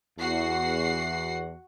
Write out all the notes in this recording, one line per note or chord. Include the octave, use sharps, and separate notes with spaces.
E2 F#4 F#5 C7